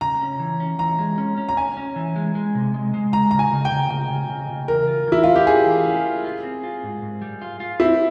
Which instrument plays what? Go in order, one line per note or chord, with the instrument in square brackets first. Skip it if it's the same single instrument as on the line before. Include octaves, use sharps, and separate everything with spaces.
[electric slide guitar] C#3 [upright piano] A#5
[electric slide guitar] C#4
E3
C#4
[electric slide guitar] E3 [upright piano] A#5
[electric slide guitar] G#3
C#4
C#4
[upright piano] A#5
[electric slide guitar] C#4 [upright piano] G#5
[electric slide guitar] C#4
E3
G#3
G#3
C3
G#3
G#3
[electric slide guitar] C#3 [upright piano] A#5
[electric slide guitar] C#3 [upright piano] A#5
[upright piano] G#5
[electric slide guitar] C#3
[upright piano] G5
[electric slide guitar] C#3
[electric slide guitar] C#3 [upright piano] G5
[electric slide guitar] C#3
C#3
C#3
[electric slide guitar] E3 [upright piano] A#4
[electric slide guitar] F4
[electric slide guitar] E3 [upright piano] E4
[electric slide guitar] C#4 [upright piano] F4
[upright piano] G4
[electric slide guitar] C#4 [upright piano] G#4
[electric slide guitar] E3
C#4
F4
F4
C4
F4
G#2
G#2
G3
F4
F4
[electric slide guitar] C4 [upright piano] E4